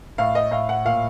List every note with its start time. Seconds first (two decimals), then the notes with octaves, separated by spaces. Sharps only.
0.18 A2 F5
0.35 D#5
0.51 A2 F5
0.69 F#5
0.85 A#2 F5